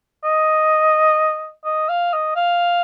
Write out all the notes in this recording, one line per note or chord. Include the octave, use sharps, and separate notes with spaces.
D#5
D#5
F5
D#5
F5